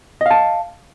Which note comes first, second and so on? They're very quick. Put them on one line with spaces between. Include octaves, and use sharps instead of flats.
D#5 F5 A5